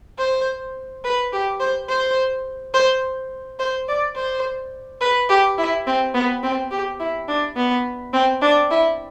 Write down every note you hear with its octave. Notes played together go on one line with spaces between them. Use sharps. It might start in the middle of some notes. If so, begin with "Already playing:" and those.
C5
B4
G4
C5
C5
C5
C5
D5
C5
B4
G4
E4
C4
B3
C4
G4
E4
D4
B3
C4
D4
E4